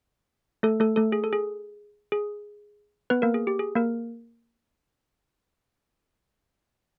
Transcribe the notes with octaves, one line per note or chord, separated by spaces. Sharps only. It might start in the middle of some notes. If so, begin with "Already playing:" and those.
A3 A4
A3 A4
A3 A4
G#4
A4
G#4
G#4
B3 B4
A#3 A#4
G#4
G4
G#4
A#3 A#4